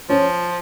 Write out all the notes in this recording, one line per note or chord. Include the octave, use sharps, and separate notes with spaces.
F3 C#4